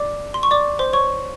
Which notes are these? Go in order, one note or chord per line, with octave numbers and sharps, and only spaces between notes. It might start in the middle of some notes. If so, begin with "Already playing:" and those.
Already playing: D5 D6
C6
C#6
D5 D6
C5 C6
C#5 C#6